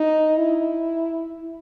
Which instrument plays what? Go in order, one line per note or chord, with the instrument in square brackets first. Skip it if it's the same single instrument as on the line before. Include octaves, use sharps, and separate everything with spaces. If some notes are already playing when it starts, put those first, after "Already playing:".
Already playing: [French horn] D#4
E4